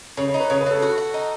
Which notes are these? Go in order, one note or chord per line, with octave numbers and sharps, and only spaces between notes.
C#3 C#5
C#5
D#4
B4
C#3 C#5
B4
C#3 A4
F#4
F#4
D#4